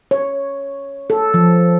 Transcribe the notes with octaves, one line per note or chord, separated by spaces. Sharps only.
C#5
A4
F3